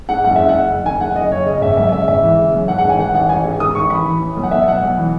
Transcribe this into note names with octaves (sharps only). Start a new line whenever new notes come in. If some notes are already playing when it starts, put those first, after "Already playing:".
G#2 F#5
F#1 F#5
F#1 E5
F#5
F#1
F#1
D#3 G#5
F#1 F#5
F#1 D#5
F#1 C#5
C#3 D#5
G#1 E5
F#2 E5
C#3 E5
G#1 E5
E3
C#3
F#2
G#2 F#5
F#5
A1
G#5
D#3 F#5
A1 F#5
A1 G#5
G#2
D#3 D#6
A1 C#6
E3 B5
E3
A2
B1
F#5
B1 E5
B1 F#5
B1
E3